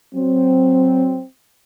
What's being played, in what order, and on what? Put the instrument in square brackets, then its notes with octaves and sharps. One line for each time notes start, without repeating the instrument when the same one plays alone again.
[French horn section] F#3 C4